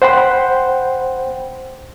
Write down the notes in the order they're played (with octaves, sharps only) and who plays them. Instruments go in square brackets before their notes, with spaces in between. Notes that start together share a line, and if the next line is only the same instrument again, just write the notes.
[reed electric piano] C5 F#5 G5 B5 C6